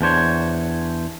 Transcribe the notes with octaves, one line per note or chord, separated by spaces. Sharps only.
E2 D4 C5 C#5